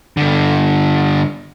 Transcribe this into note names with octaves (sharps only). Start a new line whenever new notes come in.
G2 D3